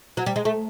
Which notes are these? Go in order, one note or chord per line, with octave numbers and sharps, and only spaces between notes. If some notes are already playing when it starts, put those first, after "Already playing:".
F#3
G3
G#3
A3